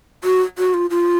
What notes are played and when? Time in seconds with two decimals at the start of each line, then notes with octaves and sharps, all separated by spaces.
0.24 F#4
0.58 F#4
0.74 F4
0.90 F4